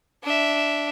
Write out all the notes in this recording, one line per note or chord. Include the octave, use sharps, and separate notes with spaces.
D4 E5